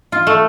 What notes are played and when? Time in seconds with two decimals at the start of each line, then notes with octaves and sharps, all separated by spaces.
0.12 F4
0.27 A3